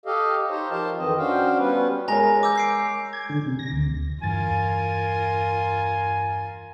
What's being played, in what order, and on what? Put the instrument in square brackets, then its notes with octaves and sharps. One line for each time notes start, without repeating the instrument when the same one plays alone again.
[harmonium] G4 A4 D#5 F5
D#4 G4 C5 C#5
F3 F4 A#4 C5 F5 A5
F2 D#3 E3 C4 D#5
C#4 D4 F#4 C5 F5 G5
G3 B3 C#4 B4
[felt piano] G#3 A#4 C#5 [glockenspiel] G#5 A#5 A#6
[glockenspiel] D6 E6 G6
G6 C7 D7
[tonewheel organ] G#6
D3
C3
A#6
D2
[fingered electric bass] E2 [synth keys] G2 A6 [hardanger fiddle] F4 A#4 [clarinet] G#5